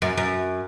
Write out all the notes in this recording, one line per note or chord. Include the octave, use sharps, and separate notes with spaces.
F#2
F#2